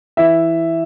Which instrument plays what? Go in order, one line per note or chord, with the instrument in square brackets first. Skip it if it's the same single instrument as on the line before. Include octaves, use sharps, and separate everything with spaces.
[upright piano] E3 E5